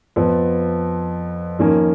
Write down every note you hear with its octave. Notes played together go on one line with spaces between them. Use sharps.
F2 F3 B3
F2 D#3 A#3 C#4